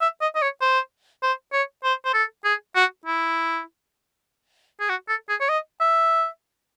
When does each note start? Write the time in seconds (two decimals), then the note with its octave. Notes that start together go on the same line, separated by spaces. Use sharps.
0.01 E5
0.21 D#5
0.35 D#5
0.42 C#5
0.61 C5
1.23 C5
1.53 C#5
1.84 C5
2.05 C5
2.14 A4
2.44 G#4
2.75 F#4
3.05 E4
4.80 G#4
4.89 F#4
5.08 A4
5.29 G#4
5.40 C#5
5.49 D#5
5.80 E5